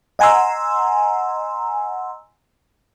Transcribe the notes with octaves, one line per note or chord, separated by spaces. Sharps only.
D#5 F#5 G#5 A#5 C6 E6